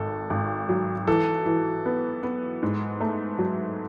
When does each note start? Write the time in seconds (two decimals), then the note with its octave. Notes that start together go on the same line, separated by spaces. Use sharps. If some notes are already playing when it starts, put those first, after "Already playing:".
Already playing: G#1 A4
0.30 G#1
0.69 F#3
1.07 E3 A4
1.46 E3
1.85 B3
2.23 B3
2.63 G#2
3.00 A3
3.38 F#3